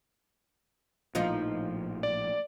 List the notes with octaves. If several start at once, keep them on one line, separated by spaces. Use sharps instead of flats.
A#1 A2 F3 D#4 F4
D5